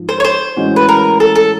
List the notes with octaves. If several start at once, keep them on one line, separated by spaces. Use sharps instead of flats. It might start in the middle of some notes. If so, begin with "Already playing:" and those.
Already playing: G#2 F3
C5
C#5
C5
A2 E3 G#3 C#4 F#4
B4
A#4
A4
A4